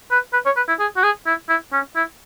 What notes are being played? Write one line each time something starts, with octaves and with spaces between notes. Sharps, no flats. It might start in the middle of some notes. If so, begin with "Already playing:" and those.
B4
B4
C#5
B4
E4
G#4
F#4
G#4
E4
E4
C#4
E4